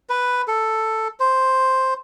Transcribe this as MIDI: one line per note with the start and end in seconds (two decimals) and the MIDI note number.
0.09 0.42 71
0.48 1.08 69
1.20 1.94 72